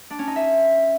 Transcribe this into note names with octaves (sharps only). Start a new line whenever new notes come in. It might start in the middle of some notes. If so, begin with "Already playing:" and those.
D4
C#4
D#4
E5